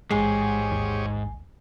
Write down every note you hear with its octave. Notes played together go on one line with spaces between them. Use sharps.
A1 G#2 G#3 G4 G#4 C#5 G#5 C7
D#2